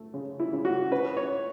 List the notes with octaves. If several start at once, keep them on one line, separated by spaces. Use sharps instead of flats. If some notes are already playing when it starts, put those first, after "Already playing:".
Already playing: A3
C#3
E4
C#3
F#4
C#4 B4
C#5